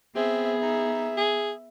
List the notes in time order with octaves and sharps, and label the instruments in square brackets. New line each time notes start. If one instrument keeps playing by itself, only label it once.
[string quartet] B3 [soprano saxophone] C4 [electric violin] G#4 [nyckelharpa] E5
[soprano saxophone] D#4 [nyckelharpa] E5
[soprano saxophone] G#4